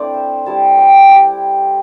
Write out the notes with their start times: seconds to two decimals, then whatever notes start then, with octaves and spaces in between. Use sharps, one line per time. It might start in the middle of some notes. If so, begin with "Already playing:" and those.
Already playing: A3 C4 D4 E4 C5 D5
0.14 E5
0.46 G3 E4 A5
0.78 G5
1.09 G3 E4 G4